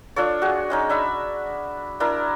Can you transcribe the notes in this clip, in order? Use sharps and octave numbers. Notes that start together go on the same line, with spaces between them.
D4 F4 A4 C#5
F#4 G#4
G#3 C#4 D#4
D4 E5 B5
D4 E4 A#4